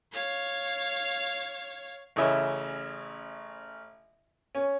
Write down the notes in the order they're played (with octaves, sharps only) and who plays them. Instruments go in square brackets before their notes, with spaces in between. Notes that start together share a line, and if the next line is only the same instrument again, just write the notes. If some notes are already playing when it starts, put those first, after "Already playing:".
[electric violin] C#5 F5
[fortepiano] A1 C#3 E4 D#5 E5
C#4